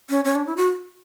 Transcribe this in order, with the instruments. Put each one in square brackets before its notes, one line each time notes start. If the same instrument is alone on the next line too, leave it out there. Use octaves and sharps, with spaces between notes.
[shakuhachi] C#4
C#4
D4
E4
F#4